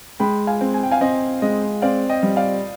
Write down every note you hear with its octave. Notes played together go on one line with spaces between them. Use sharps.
G#3 G5 B5
F5 G#5
C4
G#5
G5
F5 G#5
C4 D#5
G#3 D#5
C4 D5 F5
D#5 G5
G3
D5 F5